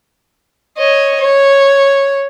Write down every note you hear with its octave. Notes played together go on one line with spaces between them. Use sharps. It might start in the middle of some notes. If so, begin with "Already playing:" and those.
C#5 D#5
C#5